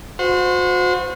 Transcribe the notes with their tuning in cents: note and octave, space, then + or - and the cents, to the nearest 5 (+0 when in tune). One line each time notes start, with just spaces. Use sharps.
F#4 -40 C5 -25